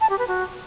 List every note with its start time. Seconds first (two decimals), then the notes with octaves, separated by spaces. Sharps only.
0.01 A5
0.10 G4
0.19 B4
0.28 F#4